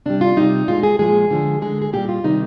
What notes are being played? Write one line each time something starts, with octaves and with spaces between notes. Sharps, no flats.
C3 G3 D4
F4
C3 G3 D#4
A#2 G#3 F4
G#4
A#2 F3 G#3 G#4
D3 F3 G#3
D3 G#3 G#4
G#4
A#2 G3 G4
F4
C3 D#3 G3 D#4